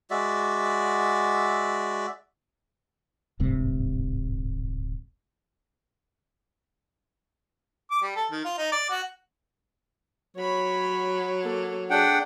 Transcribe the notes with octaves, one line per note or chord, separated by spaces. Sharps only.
G#3 F#4 D5 E5
D1 G#1 G2 C3
D6
G3
A4
D#3
F4
D#4
D5
F#4
F#3 C#5 B5
A#3 A4
D4 G#4 F#5 G5